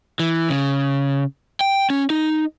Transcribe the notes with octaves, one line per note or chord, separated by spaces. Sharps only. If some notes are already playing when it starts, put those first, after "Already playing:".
E3
C#3
G5
C#4
D#4